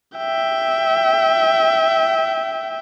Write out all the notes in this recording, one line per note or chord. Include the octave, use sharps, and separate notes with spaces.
E5 G5